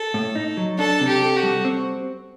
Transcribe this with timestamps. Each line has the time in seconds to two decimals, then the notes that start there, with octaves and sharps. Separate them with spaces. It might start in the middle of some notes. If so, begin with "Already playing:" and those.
Already playing: A4
0.14 A2
0.35 D#4
0.57 F#3
0.79 D4 A4
1.01 C3
1.07 G4
1.22 A4
1.36 F#4
1.43 G3
1.65 C4